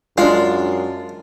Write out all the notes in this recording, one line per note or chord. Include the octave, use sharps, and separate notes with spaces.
F#2 G#3 D4 F4